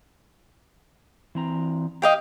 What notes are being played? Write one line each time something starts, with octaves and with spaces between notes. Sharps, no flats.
E3 C4 A#5
G4 D#5 F5 G5